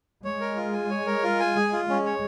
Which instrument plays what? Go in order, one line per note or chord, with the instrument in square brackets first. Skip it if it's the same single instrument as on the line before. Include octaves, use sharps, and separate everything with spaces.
[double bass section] G#3 [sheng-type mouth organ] C#5
[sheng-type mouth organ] A#4
F4
G#5
C#5
A#4
F4
G#5
[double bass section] G#3 [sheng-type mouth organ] G#4
[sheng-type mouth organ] F4
[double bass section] G#3 [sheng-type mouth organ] C#4
[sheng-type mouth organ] C#5